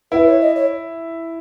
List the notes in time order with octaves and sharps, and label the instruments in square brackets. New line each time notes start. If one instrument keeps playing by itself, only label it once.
[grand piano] E4 [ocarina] B4
[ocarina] C#5
D#5
C#5